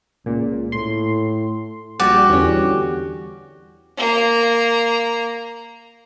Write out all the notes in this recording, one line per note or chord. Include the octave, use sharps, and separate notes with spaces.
C#2 A#2
A2 C6
A#1 G3 F#4 G4 D5
E2 D3 G3 C#4
A#3 A#5